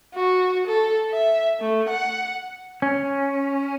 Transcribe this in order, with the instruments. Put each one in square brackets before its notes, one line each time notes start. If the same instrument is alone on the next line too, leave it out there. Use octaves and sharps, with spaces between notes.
[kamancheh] F#4
A4
E5
A3
F#5
[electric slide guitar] C#4